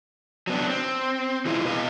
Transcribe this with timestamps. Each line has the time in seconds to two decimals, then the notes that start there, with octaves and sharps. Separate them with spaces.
0.47 F#3 B3 D4
0.69 C4
1.45 E3 G#3 E4 F4
1.65 B2 B4 D#5 F5